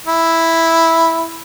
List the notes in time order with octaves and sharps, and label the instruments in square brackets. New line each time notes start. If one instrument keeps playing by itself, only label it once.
[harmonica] E4